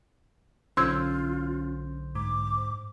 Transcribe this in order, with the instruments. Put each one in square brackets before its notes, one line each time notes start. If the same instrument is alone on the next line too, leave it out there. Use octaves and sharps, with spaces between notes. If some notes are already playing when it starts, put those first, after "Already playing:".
[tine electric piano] B1 D3 C5 [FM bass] C#4 [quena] F4 [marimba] C6 E6 G#6
[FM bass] G#2 [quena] D6